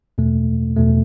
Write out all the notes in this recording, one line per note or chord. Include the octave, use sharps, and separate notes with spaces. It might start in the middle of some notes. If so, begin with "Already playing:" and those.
E2 B2 A3
E2 B2 A3